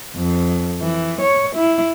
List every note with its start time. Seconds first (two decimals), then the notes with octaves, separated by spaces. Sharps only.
0.16 F2
0.81 E3
1.22 C#5
1.56 E4